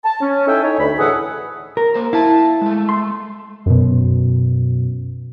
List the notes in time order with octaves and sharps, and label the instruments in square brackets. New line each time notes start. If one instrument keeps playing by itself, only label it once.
[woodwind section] A5
C#4
D#4 E4 A4 E5 G5 G#5
D#4 C#5
D2 B5
A2 E3 G#4 A4 F#5 D#6
[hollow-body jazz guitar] A#4
[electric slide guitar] A#3 C5
[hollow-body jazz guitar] E4 [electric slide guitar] F5 A5
[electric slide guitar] G#3 A3
[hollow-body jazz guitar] C6
[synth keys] F#2 B2